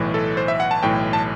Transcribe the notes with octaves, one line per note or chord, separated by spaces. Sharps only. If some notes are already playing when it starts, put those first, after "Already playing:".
Already playing: B1 A2 E3
A4
C5
E5
F#5
A5
B1 A2 E3 G5
A5